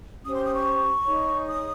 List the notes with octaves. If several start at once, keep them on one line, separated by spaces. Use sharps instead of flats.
C#4 G4 C5 D#6
C6
D#6
C#6
D#4 G#4 C#5
D#6